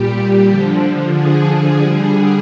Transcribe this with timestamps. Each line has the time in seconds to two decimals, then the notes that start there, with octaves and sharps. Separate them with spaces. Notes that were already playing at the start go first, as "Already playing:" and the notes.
Already playing: A#2 G3 G4
0.48 D3 F3
1.14 G#4
1.78 D3 G3